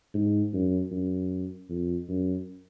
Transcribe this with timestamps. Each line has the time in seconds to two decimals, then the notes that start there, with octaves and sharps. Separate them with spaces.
0.14 G#2
0.53 F#2
0.91 F#2
1.70 F2
2.09 F#2